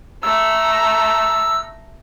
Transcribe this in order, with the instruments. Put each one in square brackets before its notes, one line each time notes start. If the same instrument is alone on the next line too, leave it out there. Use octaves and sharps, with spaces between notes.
[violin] A3 A#5 [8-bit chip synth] E6